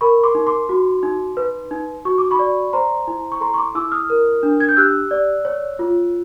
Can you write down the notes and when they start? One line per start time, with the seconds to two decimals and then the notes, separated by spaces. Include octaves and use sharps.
0.01 A#4 B5 C#6
0.23 C6 D6
0.35 D#4
0.47 C6 D6
0.69 F#4
1.03 D#4
1.37 B4
1.71 D#4
2.05 F#4 C#6
2.18 D6
2.31 B5 C#6
2.39 D5
2.73 C5 A#5 C6
3.07 E4
3.32 C#6
3.41 A4 A#5 C6
3.54 C#6
3.58 C6 D6
3.75 E4 D6 E6
3.92 D#6 F6
4.10 A#4
4.43 D4
4.60 G#6
4.69 G6
4.77 G4 E6 F#6
5.11 D5
5.45 C#5
5.79 F4